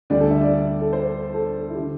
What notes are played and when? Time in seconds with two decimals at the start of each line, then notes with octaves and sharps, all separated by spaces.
0.10 D2 D3 G3 D5
0.21 A4
0.31 E5
0.41 D5
0.81 A4
0.93 C5
1.34 A4
1.69 E4
1.75 D3 G4